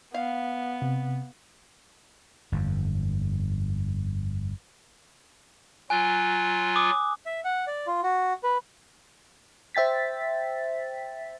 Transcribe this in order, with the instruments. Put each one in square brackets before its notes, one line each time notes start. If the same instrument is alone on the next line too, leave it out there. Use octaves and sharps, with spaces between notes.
[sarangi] B3 [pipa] F5
[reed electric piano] C3
[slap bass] G1 F2
[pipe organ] F#3 F4 [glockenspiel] G#5 F#6
[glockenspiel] D6 D#6
[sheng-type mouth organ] E5
F#5
D5
F4
F#4
B4
[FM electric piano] C5 E5 G5 A6 B6